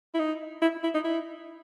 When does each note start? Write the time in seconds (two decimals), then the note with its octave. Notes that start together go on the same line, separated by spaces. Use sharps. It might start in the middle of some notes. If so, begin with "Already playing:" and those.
0.15 E4
0.19 D#4
0.62 E4
0.84 E4
0.95 D#4
1.05 E4